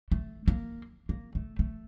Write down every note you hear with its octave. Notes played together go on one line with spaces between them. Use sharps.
A3
A#3
A#3
A3
A3